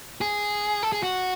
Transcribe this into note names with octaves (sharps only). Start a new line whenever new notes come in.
G#4
A4
G#4
F#4